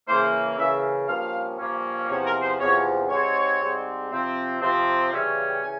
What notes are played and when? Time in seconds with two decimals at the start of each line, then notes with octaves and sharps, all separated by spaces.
0.06 C#3 E3 A#3 C5
0.57 C#3 E3 A#3 E5
1.07 G2 F3 A#3 C#4 F5
1.58 G2 F3 A#3 C#4
2.08 E2 C3 F3 C#5
2.25 A#4
2.43 C5
2.59 E2 C3 F3 C#5
3.10 G#2 G3 C4 C#5
3.60 G#2 G3 C4
4.11 C3 F3 C4
4.61 C3 F3 C4
5.12 C#3 E3 G3 C#4 E5
5.24 C#5
5.37 F5
5.50 G5
5.62 C#3 E3 G#5